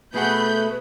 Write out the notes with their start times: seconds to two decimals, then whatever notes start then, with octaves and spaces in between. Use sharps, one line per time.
0.14 B2 A3 G#4 B4 F#5 B5 G6